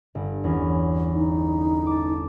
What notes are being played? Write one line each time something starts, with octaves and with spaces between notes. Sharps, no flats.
G1
E2 C#4
D#4
A5 D6